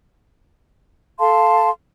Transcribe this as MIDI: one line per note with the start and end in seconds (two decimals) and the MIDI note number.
1.19 1.70 69
1.19 1.70 77
1.19 1.70 81
1.19 1.70 84